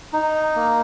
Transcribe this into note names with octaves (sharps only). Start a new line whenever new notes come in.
D#4
A#3